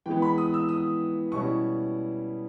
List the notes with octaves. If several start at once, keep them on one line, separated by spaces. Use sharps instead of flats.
E3 G#3 B3 G5
B5
D#6
E6
D#6
B2 G3 C#4 E4 C#6